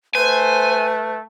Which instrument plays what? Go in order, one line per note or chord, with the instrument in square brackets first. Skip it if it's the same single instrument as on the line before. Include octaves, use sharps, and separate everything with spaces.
[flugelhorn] A3 [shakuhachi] B4 [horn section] C5 [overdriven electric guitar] G#5